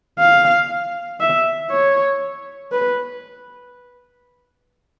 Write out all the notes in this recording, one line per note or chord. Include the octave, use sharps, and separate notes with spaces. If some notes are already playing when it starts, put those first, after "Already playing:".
F5
E5
C#5
B4